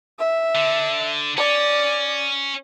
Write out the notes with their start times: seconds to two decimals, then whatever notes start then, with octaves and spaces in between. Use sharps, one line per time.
0.19 E5
0.55 D3
1.37 C#4 D5